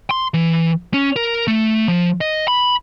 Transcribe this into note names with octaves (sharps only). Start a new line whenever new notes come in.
C6
E3
C#4
A#4
A3
F3
D#5
B5